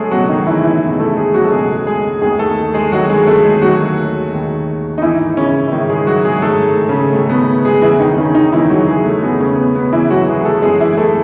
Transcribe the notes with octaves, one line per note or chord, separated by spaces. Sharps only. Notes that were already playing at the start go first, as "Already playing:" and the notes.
Already playing: F#3 G#3 A3 G#4 A4
C#2 B2 F#3 G#3 F#4
D#3 D#4
E3 E4
E3 E4
C#2 B2 G#3
A3 A4
G#3 G#4
F#3 F#4
A4
C#2 B2 G#3 G#4
G#3 G#4
D#2 D#3 G#3 G#4
A3 A4
G#3 G#4
D#2 D#3 F#3 G#3 F#4
G#3 G#4
A3 A4
G#3 G#4
D#2 D#3 F#3 G#3 F#4
D#2 D#3 G#3
D#4
G#2 D#3 E3 G#3 E4
C#3 C#4
E4
G#2 D#3 G#3 D#4
G#3 G#4
F#3 F#4
G#3 G#4
G#2 D#3 G#3 A3 A4
C#3 C#4
G#2 D#3 G#3 A3
B3
G#3 G#4
E2 C#3 E3 G#3 E4
D#3 D#4
C#3 C#4
D#3 D#4
E2 C#3 E3 G#3 E4
F#3 F#4
G#3 G#4
A3
E2 C#3 G#3 B3
C#3 C#4
B3
B3
E2 C#3 E3 G#3 E4
F#3 F#4
G#3 G#4
A3 A4
F#2 E3 G#3 G#4
E3 E4
A3 A4